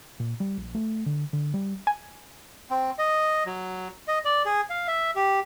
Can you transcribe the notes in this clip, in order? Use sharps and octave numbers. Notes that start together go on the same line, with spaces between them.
A#2
G3
A#1
A3
D3
D3
G3
G#5
C4
D#5
F#3
D#5
D5
G#4
F5
E5
G4